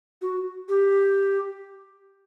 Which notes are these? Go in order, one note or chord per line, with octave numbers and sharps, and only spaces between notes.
F#4
G4